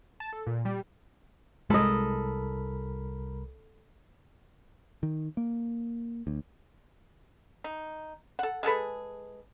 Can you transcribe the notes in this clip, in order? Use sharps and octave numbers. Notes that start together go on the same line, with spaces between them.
A5
A4
A#2
G3
C2 G#3 A4 A#4 D#5 B5
D#3
A#3
D2
D#4
A4 F#5
G#3 G#4 A4 B4